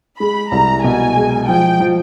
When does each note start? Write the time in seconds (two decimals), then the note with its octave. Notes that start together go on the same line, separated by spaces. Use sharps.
0.19 G#3 B5
0.52 C2 A#5
0.84 B2 G#5
1.16 G#3
1.48 F3 G5
1.80 F3